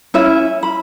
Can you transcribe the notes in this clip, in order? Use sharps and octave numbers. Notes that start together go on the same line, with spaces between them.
C#4 E4 E5
B5